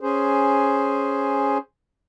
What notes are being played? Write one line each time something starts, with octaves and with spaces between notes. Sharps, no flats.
C#4 G#4 C5